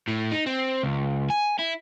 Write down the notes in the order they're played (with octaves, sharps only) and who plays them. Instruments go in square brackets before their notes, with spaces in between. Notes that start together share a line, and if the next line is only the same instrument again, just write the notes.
[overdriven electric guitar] A2
D#4
C4
C#2
G#5
E4